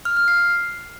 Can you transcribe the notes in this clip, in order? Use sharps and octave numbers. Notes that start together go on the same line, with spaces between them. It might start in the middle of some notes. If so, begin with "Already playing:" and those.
F6
F6
C7